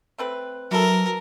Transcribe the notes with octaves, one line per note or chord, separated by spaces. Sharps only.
A3 C4 B4
E3 F#3 E4 A4 A#4